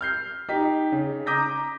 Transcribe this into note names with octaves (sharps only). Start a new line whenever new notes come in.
F6 G6 C7
D#4 G4 B6
C#3
A#5 D6 D#6 G6 A#6 B6